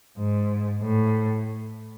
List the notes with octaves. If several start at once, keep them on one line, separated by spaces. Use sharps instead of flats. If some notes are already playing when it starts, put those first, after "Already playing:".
G#2
A2